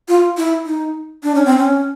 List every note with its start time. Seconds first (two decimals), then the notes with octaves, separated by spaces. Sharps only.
0.08 F4
0.37 E4
0.65 D#4
1.23 D4
1.35 C#4
1.45 C4
1.57 C#4